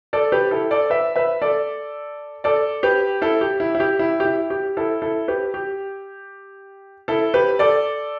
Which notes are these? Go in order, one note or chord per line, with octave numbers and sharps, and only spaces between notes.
A4 D5
G4 B4
E4 A4
A4 D5
B4 E5
B4 E5
A4 D5
A4 D5
G4 B4
E4 A4
G4
E4
E4
G4
E4
G4
E4
G4
E4 A4
E4 A4
G4 B4
G4
E4 A4
G4 B4
A4 D5